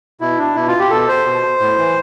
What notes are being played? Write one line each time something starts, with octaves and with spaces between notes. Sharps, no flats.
B2 E4
D4
B2 E4
F4
G4
B2 A4
C5
B2
A2
E3